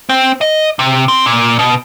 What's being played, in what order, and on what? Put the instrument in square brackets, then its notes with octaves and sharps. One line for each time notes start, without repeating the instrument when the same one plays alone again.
[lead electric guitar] C4
D#5
C3
C4
A#2
B2